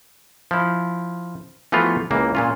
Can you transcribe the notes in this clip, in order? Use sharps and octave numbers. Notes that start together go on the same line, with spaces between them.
F3 E4
E3 F3 A3 B3 F4 F#4
C#2 E3 A#3
A#2 C#4 F4